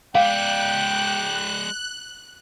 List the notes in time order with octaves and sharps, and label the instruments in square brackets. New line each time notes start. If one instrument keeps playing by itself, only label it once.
[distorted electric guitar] G#3 D5 [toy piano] F5 [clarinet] G5 [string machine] F#6